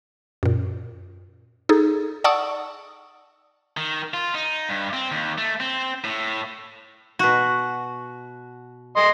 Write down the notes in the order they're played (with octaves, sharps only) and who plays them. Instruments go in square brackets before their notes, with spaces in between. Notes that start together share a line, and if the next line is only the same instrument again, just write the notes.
[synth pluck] F#2 A#2
D#4 G#4 A4
D5 F#5 A5 C#6 D#6 E6
[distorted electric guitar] D#3
F4
D#4
G2
C4
D#2
A3
C4
A2
[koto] B2 F#4
[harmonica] D#5 C6